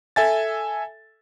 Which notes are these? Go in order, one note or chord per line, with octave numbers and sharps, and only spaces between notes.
A4 E5 G#5 A6